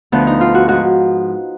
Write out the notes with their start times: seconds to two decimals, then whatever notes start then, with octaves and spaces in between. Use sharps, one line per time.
0.12 D2 D3 F3 B3
0.27 D#4
0.41 F4
0.55 F#4
0.68 G#2 F3 F#4